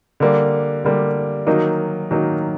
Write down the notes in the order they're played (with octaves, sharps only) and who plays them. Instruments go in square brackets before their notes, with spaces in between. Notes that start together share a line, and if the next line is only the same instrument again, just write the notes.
[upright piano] D3 G3 A#3
D3 G3 A#3
D#3 F#3 A#3 D#4
D#3 F#3 A#3 D#4